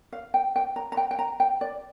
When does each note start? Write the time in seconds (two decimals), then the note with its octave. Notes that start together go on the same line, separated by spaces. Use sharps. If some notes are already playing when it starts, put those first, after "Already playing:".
0.13 F5
0.34 G5
0.56 G5
0.76 A#5
0.92 A#5
0.97 G5
1.11 G5
1.19 A#5
1.40 G5
1.61 D5